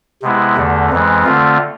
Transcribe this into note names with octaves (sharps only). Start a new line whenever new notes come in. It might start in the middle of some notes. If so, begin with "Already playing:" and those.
C3 G#3 B3 E4
E2 D3 A3
F2 E3 G#3
D3 A3 C4 F4